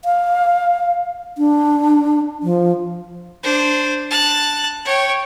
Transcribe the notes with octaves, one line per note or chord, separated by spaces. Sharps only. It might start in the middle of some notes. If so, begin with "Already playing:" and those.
F5
D4
F3
D4 C5
A5 F#6
C#5 G5